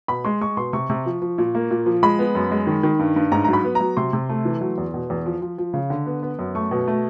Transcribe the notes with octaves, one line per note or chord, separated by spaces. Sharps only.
B2 B5
G#3 C6
G#3 C#6
B2 C6
C3 C#6
C3
F3
F3
A#2
A#3
A#2
F3
G#3 B5
B3
F#2
G#3
D#3
D#3
G2
G2
G#2 A#5
F#3 A#5
B5
B3
A#5
F#3
C3 C6
C3
A3
E3
F#3
E2
B2
E2
F3
F3
F3
C#3
D3
B3
B3
F#2
A3 C#6
B2
A3